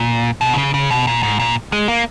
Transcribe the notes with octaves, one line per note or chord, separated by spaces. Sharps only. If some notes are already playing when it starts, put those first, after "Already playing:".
Already playing: A#2
B2
D#3
C#3
C#3
B2
A#2
G#2
A#2
G#3
A#3